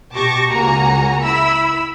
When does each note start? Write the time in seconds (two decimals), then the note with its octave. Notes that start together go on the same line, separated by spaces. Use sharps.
0.13 B2 G4 A5 C#6 D6 A#6
0.51 C#2 A#3 F#4 G#5 A#5 C#7
1.21 E4 B5 E6